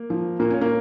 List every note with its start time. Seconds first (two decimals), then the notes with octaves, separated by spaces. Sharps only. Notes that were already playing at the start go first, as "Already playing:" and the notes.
Already playing: A#3
0.10 F3
0.40 A#2 A#3
0.50 C#4
0.61 A#3